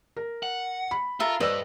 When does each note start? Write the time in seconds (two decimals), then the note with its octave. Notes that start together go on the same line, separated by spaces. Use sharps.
0.17 A#4
0.43 F#5
0.91 B5
1.20 F4 A4 A#4 E5
1.40 G2 A4 B4 C5 D5 D#5 E6